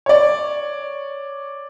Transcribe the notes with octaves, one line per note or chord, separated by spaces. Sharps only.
C#5 D5